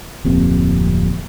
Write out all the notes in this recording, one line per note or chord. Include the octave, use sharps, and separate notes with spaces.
D1 F2 C3 A#3